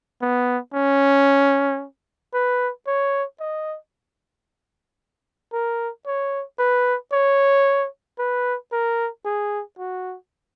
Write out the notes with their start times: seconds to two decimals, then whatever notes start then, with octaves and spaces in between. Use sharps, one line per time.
0.21 B3
0.74 C#4
2.34 B4
2.87 C#5
3.40 D#5
5.53 A#4
6.07 C#5
6.59 B4
7.13 C#5
8.19 B4
8.72 A#4
9.25 G#4
9.78 F#4